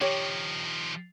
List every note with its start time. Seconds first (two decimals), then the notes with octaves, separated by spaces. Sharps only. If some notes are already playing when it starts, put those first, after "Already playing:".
0.01 D#3 F3 G4 C#5